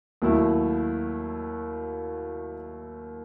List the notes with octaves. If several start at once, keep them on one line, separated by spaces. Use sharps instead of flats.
D#2 D#3 F#3 A3 E4